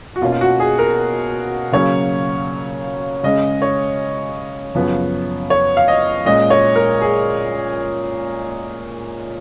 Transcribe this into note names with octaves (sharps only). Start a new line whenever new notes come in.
F#4
B2 A#3 C#4 F4
F4
F#4
G#4
A#4
C#3 F#3 A#3 C#4 C#5
C#3 G#3 C#4 D#5
C#5
F#2 C#3 F3 B3
C#5
F5
D#5
A#2 G#3 C#4 D#5
C#5
A#4
G#4